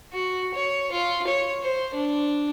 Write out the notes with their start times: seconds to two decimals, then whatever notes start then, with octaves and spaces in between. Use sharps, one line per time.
0.13 F#4
0.54 C#5
0.92 F4
1.27 C#5
1.63 C5
1.94 D4